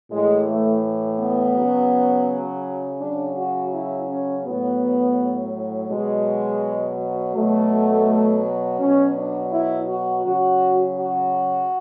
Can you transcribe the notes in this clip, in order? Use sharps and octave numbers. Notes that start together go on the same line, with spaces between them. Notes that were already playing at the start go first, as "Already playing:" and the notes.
A2 E3 G#3
A3
B3
C#3 F#3
C#3 F#3 D4
F#4
E4
C#4
A2 F#3 B3
B2 F#3 G#3
B2 F#3 A3
B2 F#3 C#4
D4
E4
F#4
C#3 F#3 F#4
F#4